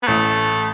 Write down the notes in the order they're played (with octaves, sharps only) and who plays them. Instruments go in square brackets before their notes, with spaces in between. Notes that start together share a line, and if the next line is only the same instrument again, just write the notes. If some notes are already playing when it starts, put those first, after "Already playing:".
[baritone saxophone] B3
[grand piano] A1 [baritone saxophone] A3